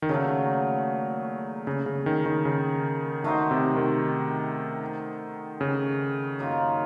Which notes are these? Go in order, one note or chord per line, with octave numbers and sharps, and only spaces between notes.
D#3
A#2 C#3 F#3 A3
C#3
C#3
D#3
D#3
C#3
D#3 A3 D#4 F#4 C5
C3
D#3
C#3
F#2 D#3 A#3 F4